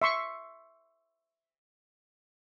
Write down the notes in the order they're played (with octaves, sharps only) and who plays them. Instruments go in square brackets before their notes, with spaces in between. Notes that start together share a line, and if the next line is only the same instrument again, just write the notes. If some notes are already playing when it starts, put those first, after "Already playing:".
[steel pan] E5 C6 C#6